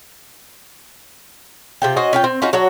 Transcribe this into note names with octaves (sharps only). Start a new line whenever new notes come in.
C3 F4 G5
C#4 F#4 C5 D#5
C#4 F4 G5
C4
C#4 D#4 F4 F#4
F#3 D4 F#4 C#5